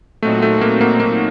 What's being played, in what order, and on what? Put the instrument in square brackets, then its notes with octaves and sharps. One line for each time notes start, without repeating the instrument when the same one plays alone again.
[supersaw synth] A#2 F#3 C4 D#4 F#4 [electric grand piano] A3
[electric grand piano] A3
A#3
A#3
A#3